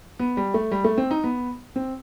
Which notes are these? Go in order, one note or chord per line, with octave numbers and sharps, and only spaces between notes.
B3
G3
A3
G3
A3
C4
D#4
B3
C4